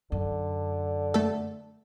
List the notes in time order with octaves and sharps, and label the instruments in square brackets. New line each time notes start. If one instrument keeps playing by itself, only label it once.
[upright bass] F#2 [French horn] D3
[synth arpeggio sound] A3 A4